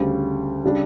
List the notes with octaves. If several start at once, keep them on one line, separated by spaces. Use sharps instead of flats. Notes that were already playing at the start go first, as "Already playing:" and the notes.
Already playing: D2 C#3 G3
C#3 G3 D4